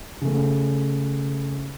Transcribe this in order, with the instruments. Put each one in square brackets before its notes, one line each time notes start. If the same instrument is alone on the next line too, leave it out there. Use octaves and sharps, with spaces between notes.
[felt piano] C#3 A3